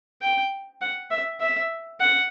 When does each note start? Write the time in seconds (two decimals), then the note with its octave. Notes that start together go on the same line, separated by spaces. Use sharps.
0.22 G5
0.81 F#5
1.11 E5
1.41 E5
2.00 F#5